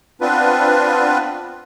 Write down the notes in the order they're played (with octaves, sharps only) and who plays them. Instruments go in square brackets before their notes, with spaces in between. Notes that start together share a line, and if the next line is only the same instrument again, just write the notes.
[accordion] B3 C4 D4 F4 B4